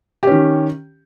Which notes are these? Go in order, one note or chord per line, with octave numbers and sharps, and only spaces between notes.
D#3 C#4 G4